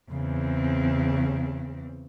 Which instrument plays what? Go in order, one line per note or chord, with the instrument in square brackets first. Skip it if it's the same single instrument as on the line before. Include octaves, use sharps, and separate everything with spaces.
[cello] E2 C4 [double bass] C#3